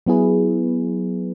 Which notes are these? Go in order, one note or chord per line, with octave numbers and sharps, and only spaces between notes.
F#3 B3 E4 G#4 B4